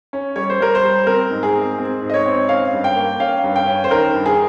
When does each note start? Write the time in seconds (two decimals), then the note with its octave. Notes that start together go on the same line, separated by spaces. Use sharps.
0.13 C#4
0.36 G3 C#5
0.50 C5
0.60 G3 A#4
0.75 C5
0.83 G3
1.07 C4 A#4
1.30 G#2
1.43 G#4
1.55 C4
1.78 C4
2.02 G#2
2.10 D#5
2.14 C#5
2.26 C4
2.49 C#4 F5
2.73 G2
2.84 G5
2.96 A#3
3.20 C#4 F5
3.44 G2
3.56 G5
3.67 C#4
3.84 C5
3.91 D#3 A#4
4.14 G2
4.26 G#4